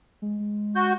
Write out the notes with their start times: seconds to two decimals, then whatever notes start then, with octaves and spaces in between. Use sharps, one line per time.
0.22 G#3
0.76 F#4 G6